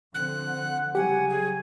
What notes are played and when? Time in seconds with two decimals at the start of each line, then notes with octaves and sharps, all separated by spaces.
0.14 D3 F3 C4 F#6
0.46 F#5
0.95 C#3 F#3 G3 G4 F#5 G#5
1.29 G#4